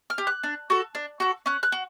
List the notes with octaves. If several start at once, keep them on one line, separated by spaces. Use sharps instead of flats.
F6
G4
F#6
D4
F#4 A4
D4
F#4 A4
C#4 F#6
F#6
F#4